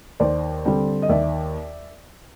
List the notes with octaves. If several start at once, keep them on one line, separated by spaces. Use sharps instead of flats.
D#2 C5 D5
D3 G3 C4
D#5
D#2 D5 E5